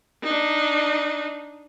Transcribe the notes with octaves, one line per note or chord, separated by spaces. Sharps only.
D4 D#4